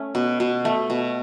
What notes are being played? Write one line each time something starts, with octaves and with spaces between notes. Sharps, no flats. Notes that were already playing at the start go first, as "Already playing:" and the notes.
Already playing: A3 C#4
B2
B2
A3
B2